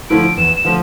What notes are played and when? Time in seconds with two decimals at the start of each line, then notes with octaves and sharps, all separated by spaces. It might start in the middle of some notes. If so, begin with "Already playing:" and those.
0.10 D3 F3 A3 E4 D7
0.37 E2 E7
0.56 E7
0.65 D3 F3 A3